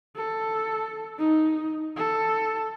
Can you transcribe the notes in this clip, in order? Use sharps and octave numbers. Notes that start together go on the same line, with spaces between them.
A4
D#4
A4